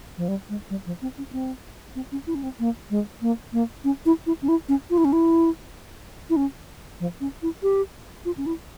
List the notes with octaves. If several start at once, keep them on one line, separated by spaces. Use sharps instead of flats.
F3
G3
G#3
G3
F3
C4
C#4
C4
C4
C#4
E4
C#4
C4
A#3
G#3
A#3
A#3
C#4
E4
E4
C#4
E4
C#4
F4
E4
C#4
E4
E4
C#4
F3
C#4
E4
G4
F4
C#4
E4